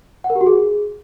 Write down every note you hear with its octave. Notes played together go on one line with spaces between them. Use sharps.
F#5
A#4
G4
F#4
G#4